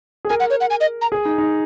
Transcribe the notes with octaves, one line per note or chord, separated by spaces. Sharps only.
G#4
A#4 G#5
F#5
C#5
F#5
G#5
D#5
A#5
G#4
D#4
D#4